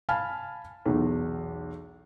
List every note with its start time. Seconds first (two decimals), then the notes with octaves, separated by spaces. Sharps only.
0.09 F5 G#5 A5 B5 F6
0.86 B1 E2